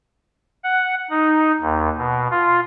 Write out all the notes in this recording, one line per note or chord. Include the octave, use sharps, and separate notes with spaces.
F#5
D#4
D#2
B2
F4